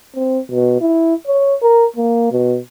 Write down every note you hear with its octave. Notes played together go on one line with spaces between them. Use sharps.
C4
B2
E4
C#5
A#4
A#3
B2